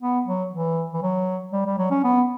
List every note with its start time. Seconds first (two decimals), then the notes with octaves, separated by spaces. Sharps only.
0.01 B3
0.26 F#3
0.52 E3
0.94 E3
1.02 F#3
1.53 G3
1.66 G3
1.78 F#3
1.91 C#4
2.04 B3